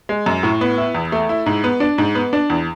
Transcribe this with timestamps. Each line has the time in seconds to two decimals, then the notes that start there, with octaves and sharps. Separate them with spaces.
0.09 G#3
0.26 F#2
0.43 A2
0.61 B3
0.78 E4
0.95 E2
1.12 A3
1.29 E4
1.46 G#2
1.64 B3
1.80 D4
1.98 G#2
2.15 B3
2.33 D4
2.50 E2